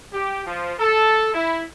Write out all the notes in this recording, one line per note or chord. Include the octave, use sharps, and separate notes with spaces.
G4
F3
A4
E4